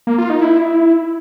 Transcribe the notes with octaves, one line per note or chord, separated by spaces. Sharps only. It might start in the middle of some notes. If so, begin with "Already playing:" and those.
A#3
F4
D#4
E4